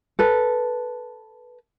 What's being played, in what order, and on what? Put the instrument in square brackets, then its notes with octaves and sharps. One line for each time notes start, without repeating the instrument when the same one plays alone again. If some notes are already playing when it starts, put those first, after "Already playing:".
[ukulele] A4 B4